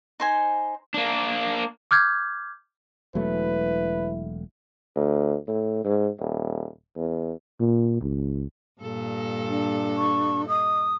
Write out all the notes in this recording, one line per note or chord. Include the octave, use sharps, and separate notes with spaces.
D#4 C5 G#5
A#3 D4
D6 F6 G6 G#6
E1 F#3 A3 E4 B4
D2
A2
G#2
D#1
E2
A#2
C#2
G2 A#2 A4
D4
C#6
D#5 D#6